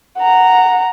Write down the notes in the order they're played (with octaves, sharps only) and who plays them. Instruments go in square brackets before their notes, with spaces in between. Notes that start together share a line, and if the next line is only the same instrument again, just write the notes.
[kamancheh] F#5 A#5